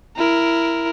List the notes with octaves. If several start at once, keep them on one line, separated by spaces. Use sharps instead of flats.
E4 A#4